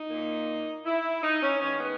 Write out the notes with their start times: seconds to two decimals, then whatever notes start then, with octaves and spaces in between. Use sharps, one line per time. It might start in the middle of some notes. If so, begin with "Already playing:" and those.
Already playing: D#4
0.10 A#2 A#3
0.85 E4
1.23 D#4
1.41 C#4
1.60 D#3 G#3 B3 C#4
1.79 B3